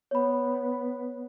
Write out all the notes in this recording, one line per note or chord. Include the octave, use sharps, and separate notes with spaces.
B3 C#5 B5